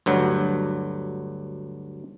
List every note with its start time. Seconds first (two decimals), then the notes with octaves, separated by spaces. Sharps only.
0.06 D2 G2 F#3